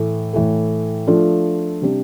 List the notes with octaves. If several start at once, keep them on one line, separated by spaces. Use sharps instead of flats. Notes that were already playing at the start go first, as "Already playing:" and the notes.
Already playing: A2 E3 A3
A2 E3 A3
F3 A3 D4 F4
C3 G3 D4